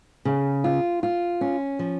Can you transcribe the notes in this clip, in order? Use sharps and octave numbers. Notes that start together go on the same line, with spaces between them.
C#3
F4
F4
C#4
F3